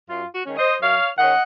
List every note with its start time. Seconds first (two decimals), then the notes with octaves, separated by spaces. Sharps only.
0.09 F#2 F4
0.33 F#4
0.45 D#3 G#3 C#4
0.57 C5 D#5
0.82 F#2 C#5 F5
1.18 D#3 G#3 C#4 D#5 F#5